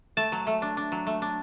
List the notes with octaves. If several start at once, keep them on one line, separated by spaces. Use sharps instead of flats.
A3 A5
F#3
A3
D4
D4
F#3
A3
D4